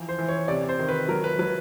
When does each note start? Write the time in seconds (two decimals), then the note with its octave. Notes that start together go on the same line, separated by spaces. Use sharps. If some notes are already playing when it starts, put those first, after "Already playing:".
Already playing: E3 F3
0.09 C5
0.19 E3
0.28 C#5
0.48 C3 D5
0.69 C5
0.79 D#3
0.89 B4
1.08 F#3 A#4
1.24 B4
1.39 F#3 B4